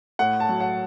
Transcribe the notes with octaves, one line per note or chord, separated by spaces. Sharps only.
A2 F#5
A5
F#3
F#5